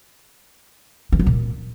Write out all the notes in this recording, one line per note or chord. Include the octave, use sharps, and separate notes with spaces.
E3
F#3
A#2